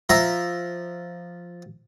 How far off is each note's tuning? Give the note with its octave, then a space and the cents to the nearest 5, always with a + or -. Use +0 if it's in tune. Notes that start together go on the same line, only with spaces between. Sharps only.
F3 +0 E5 +0 A#5 +0